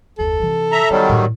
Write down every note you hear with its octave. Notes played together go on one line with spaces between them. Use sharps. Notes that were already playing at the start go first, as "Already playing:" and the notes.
F#1 D#2 A4
C3 E3
E5 A#5
D#3 F#3 G3 B3
A2